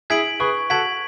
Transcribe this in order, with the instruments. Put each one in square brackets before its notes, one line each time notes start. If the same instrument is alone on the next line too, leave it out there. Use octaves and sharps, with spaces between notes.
[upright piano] E4 G#4 [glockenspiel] G#6 B6 D7 F#7
[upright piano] G#4 B4 [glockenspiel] C#6
[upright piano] F#4 A4 [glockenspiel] G#6 B6 D7 F#7